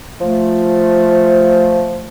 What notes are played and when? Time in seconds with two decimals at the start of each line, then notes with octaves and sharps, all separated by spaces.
0.21 F3 A3